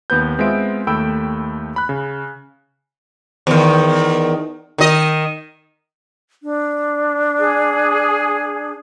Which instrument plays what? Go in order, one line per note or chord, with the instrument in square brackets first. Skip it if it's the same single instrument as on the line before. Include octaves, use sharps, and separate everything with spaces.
[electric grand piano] D#2 B3 B4 G6
G#3 B3 C4 F4 E5 D7
D#2 A3 G5 B5 E6 D7
B5 F#6
C#3
[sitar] E2 D#3
D#3 D#5
[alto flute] D4
[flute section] G#4